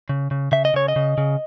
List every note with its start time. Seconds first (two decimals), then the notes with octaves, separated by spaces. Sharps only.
0.09 C#3
0.31 C#3
0.52 C#3 E5
0.65 D#5
0.74 C#3 C#5
0.88 D#5
0.96 C#3
1.18 C#3